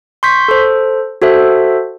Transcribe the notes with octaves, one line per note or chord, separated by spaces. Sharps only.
C6 C#6 G6 B6
A4 C5
F#4 A4 C5 E5